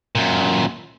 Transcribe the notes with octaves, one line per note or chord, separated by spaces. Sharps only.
F#2 A#2